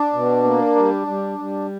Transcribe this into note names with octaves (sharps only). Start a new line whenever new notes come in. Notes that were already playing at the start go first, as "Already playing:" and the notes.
Already playing: D4
B2
A#3
G3
G3
G3